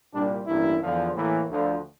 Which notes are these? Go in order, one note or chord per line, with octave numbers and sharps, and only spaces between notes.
C2 A#2 G3 D4
A1 G2 E3 A#3 E4
E2 D3 F3
A2 E3 A#3
D2 D3 F3